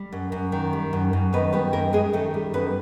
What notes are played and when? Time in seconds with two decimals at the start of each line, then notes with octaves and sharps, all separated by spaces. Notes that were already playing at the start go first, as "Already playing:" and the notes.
Already playing: G3
0.13 F#2
0.32 F#2
0.52 D#3
0.73 G3
0.93 F#2
1.13 F#2
1.33 D#3 B3 B4
1.53 G3 B3 B4
1.73 F#2 A#3 A#4
1.93 F#2 G#3 G#4
2.13 D#3 A3 A4
2.34 G3
2.54 F#2 B3 B4